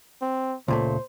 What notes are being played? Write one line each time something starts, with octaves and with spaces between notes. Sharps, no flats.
C4
C#2 A#2 A3 C5